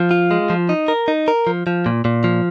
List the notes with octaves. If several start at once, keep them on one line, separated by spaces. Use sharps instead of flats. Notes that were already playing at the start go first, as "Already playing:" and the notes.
Already playing: F3
F4
G#3
F3
D#4
A#4
D#4
A#4
F3
F3
A#2
A#2
F3